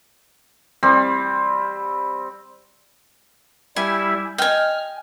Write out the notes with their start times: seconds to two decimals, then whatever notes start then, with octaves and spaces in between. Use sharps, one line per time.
0.83 G3 C4
3.76 G3 E4 E5 G#5
4.38 D#5 G5 G#5 F6